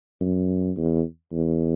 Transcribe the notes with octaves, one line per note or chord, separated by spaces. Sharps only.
F#2
E2
E2